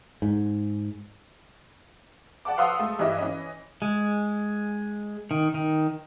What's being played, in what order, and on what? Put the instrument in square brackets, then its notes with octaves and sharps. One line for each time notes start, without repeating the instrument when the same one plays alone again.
[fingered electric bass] G#2
[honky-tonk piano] D5 F#5 A5 D6
B4 F5 F#5 C6 D#6 E6
G#3 A3
G2 E3 G3 D#5 E5 D6
E3 C#4 D#5
[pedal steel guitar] G#3
D#3
D#3